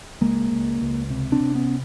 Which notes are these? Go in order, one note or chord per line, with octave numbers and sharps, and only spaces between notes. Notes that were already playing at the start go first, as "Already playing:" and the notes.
C#2 G#3 A#3
C#2
C#2
C3
C4 D4
C3
B3 C#4